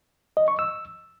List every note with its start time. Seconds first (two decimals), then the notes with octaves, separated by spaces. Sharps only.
0.37 D#5
0.48 C#6
0.59 E6